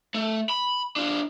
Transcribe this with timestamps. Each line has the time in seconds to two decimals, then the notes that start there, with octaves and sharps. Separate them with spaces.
0.14 A3
0.50 B5
0.96 D4 F4